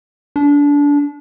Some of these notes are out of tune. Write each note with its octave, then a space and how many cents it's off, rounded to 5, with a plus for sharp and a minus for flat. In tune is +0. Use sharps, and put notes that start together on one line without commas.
D4 -25